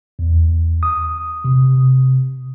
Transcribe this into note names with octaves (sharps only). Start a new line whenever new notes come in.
E2
D#6
C3